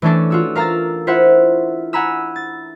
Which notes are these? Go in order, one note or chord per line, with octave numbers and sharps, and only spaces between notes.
E3 A3 C#4 D4 A4
F4 F#4 E6
A#4 F5 A#5 E6 A6
E4 F4 C5 E5 F#5
F#5 G#5 A#5 B5 E6
A6